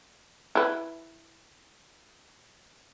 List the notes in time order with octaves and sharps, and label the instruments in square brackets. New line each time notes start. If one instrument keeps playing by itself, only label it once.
[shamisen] E4 B4